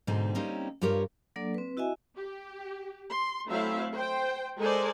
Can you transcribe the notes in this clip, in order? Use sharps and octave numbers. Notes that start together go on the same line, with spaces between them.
G#2 B2 D3 C4 D#4
G3 A#3 C4 C#4 D#4 E4
G2 F4 G4 A#4 C#5
F#3 A#3 D4 A4 D5
C4 B4
E4 F#4 D#5 E5 G#5
G4
C6
F#3 A3 C4 E4 E5 F5
C5 G5
G#3 A4 A#4 C5 D5 G#5